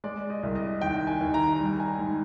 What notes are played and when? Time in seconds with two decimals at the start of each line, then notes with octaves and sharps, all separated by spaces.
0.04 G#3 D5
0.30 D#5
0.43 C2
0.55 D#5
0.81 D#2 G5
1.07 G#5
1.21 D#2
1.34 A#5
1.60 G3
1.80 G#5
1.99 G#2